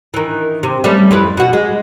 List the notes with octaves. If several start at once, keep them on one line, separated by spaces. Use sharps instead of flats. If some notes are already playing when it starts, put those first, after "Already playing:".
D#3 E3
C3
G3 A3 C#4
F2 E4 B4
B2 F#4
G#3